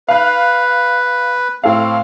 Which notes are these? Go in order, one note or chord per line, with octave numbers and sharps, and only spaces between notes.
B4 F5 F#6
A2 C4 A4 F5